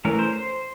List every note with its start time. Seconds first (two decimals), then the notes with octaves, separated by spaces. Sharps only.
0.05 E3 A3 C#4 A#4
0.19 C5
0.33 C5